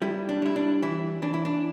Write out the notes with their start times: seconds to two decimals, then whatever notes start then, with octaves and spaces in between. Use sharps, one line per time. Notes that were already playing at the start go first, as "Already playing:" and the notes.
0.02 G3 E4
0.29 D4
0.42 G3 E4
0.56 D4
0.82 E3 E4
1.22 E3 D4
1.34 E4
1.45 D4